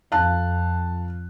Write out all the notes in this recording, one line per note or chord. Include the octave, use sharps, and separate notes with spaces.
F2 F5 A5 F#6